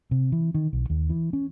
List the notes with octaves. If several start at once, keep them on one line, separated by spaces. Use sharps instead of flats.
C3
E3
D#3
B1
D#2
E3
C#4